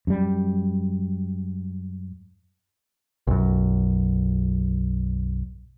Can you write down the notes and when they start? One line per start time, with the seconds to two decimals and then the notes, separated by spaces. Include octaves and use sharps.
0.07 F#2 G3
3.27 B1 F#2